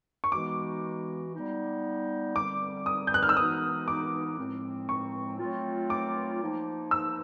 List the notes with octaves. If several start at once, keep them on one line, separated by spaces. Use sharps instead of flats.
C#6
E3 G#3 B3 D#4 F#4 D6
G3 B3 D#4
D3 G3 C4 D6
D#6
G6
F#6
F6
E6
E3 G#3 B3 D#4 F#4 D#6
D6
A2 F3 G#3 C4
C#6
F#3 A3 C4 F4
D6
F3 A#3 D#4
E6